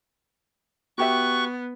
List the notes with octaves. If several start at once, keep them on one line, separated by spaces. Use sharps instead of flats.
B3 F#4 G4 E5 C#6 F#6